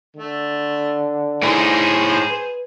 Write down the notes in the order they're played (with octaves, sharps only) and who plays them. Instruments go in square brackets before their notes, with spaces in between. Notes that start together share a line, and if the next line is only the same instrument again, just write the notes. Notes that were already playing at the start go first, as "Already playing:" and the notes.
[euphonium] D3 [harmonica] A3
[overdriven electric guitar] A2 D#4 [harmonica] G#4 C5
[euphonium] B4